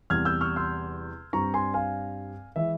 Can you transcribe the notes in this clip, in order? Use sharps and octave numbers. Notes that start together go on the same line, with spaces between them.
E2 C3 G3 F6 G#6
E6 G6
C#6 F6
C6 E6
G2 G3 C4 A#5 C#6
G#5 C6
F5 G#5
E3 G#3 E5